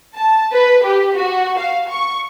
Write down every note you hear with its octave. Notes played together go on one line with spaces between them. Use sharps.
A5
B4
G4
F#4
F5
C#6